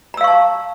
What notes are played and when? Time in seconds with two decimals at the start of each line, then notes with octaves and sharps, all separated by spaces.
0.14 A#5
0.17 E6
0.21 F5
0.24 C#6
0.28 A5